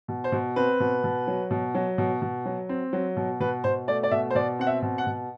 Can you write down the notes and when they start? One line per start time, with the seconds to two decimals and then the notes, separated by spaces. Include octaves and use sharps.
0.08 B2
0.24 C5
0.32 B2
0.56 C4 B4
0.80 B2
1.04 B2
1.27 F#3
1.51 B2
1.75 F#3
1.98 B2
2.22 B2
2.45 F#3
2.69 C4
2.93 F#3
3.17 B2
3.40 B2 B4
3.64 B2 C5
3.88 A3 D5
4.03 D5
4.11 B2 E5
4.30 C5
4.35 B2 D5
4.59 C4 F#5
4.67 E5
4.82 B2
4.98 F#5
5.06 B2